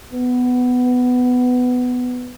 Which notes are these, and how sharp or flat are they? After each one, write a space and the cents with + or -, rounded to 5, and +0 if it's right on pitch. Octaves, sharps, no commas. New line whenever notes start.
B3 +10